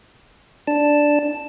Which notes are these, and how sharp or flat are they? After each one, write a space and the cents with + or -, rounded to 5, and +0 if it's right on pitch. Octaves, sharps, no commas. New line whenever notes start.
D4 +0 A5 +0